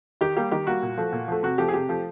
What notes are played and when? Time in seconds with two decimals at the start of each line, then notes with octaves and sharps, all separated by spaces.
0.21 D#3 G4
0.37 G3 A#3 G4
0.51 D#3 G4
0.67 G3 A#3 F#4
0.83 A#2
0.98 F3 A3
1.13 A#2
1.28 F3 A3
1.43 C3 F#4
1.58 F3 A3 G4
1.68 G#4
1.73 C3 G4
1.89 F3 A3